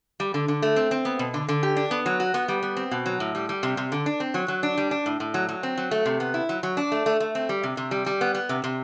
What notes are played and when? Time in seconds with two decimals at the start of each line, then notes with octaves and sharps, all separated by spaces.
0.20 G3
0.34 D3
0.48 D3
0.62 A3
0.76 C4
0.91 C4
1.05 B3
1.19 B2
1.34 D3
1.49 D3
1.63 G4
1.77 D4
1.91 B3
2.06 F#3
2.20 F#4
2.34 B3
2.48 G3
2.63 B3
2.77 C4
2.91 B2
3.06 F#3
3.20 A2
3.35 G3
3.49 G3
3.63 C3
3.77 C3
3.92 D3
4.06 D4
4.20 C4
4.34 F#3
4.48 F#3
4.63 D4
4.77 G3
4.91 D4
5.06 A2
5.20 A2
5.34 F#3
5.49 F#3
5.63 C4
5.78 F#3
5.91 A3
6.06 C3
6.20 B3
6.34 E4
6.49 F#3
6.63 F#3
6.77 D4
6.92 A3
7.06 A3
7.20 A3
7.35 C4
7.49 G3
7.63 C3
7.77 C3
7.91 G3
8.06 G3
8.21 B3
8.35 B3
8.49 C3
8.64 C3